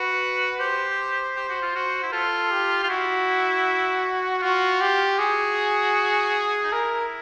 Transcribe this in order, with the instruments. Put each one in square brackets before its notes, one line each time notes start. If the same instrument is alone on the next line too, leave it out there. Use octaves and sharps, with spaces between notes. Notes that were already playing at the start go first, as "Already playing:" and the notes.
Already playing: [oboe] F#4 [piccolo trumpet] B4
[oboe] G4 [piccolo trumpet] C5
[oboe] G4
F#4
F4
F#4
E4
[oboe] F4 [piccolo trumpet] A4
[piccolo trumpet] G4
[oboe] F4
[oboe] E4 [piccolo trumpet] F#4
[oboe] F4 [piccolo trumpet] F#4
[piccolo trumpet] G4
[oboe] F#4 [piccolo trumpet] G#4
[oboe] D#4
[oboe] E4 [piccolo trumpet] A#4